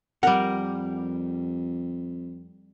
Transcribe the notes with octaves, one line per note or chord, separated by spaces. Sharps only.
F2 G3 A#4 F#5